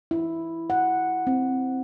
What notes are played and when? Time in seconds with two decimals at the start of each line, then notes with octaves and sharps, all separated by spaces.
0.11 E4
0.70 F#5
1.27 C4